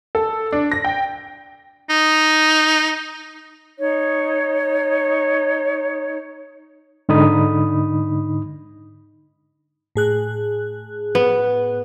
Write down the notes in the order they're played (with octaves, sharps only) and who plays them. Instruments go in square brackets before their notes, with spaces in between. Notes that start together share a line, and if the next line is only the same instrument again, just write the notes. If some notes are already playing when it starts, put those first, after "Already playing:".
[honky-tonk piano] A4
D4
A#6
G5
[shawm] D#4
[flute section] D#4 C#5
[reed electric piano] G#2 D3 D#4 B5 D#6
[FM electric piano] A2 G#4 F#6
[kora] B3